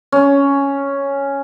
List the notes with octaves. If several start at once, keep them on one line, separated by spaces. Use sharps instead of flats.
C#4